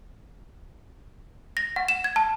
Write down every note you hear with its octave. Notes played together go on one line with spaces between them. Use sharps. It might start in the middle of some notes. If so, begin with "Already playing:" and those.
A#6
F#5
E7
G#6
A5